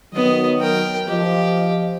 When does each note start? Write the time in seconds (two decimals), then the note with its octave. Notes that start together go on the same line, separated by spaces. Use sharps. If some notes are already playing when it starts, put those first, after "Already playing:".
0.14 D#3 F#3 B3 D#5
0.59 A#4 G5
1.08 F3 G4 D#5